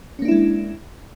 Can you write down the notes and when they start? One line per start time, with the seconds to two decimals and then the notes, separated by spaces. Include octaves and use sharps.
0.19 C#4
0.22 A#3
0.25 D4
0.28 E4
0.31 G#3